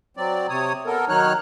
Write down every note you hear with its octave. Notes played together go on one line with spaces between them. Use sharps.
F#3 C4 D5
C3 C#5 D#6
B3 A4 A#4
D#3 F#3 D#4 C#5 F6 F#6